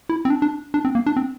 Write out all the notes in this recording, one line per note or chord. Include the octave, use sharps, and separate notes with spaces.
E4
C4
D4
D4
D4
C4
A#3
D4
C4